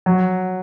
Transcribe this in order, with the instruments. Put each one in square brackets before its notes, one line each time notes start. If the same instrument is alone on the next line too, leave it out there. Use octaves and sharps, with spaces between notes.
[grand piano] F#3